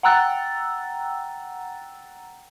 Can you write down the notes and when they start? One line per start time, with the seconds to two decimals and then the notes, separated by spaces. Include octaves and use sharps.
0.03 F#5 G5 A#5 E6 F#6 A6